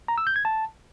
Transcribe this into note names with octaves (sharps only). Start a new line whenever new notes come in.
A#5
E6
G6
G#6
A5